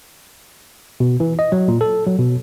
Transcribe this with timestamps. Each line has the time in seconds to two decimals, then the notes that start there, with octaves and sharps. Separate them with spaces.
1.00 B2
1.20 E3
1.39 D#5
1.52 F#3
1.68 A#2
1.81 A4
2.07 F#3
2.19 B2